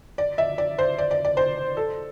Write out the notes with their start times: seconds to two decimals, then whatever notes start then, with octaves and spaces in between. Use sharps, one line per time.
0.18 D5
0.38 E5
0.58 D5
0.78 C5
0.98 D5
1.11 D5
1.25 D5
1.37 C5
1.77 A4